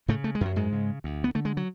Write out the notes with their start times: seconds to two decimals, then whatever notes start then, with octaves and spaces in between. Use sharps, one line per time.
0.08 A2 C#3 A3
0.24 A3
0.35 G#3
0.41 F#2 F#3
0.56 G#2 G#3
0.72 C#3
1.04 D2
1.24 B3
1.35 D3 A3
1.45 G#3
1.57 F#3